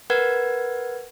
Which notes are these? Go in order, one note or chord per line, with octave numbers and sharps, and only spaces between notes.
A#4 B4 F#5 G#6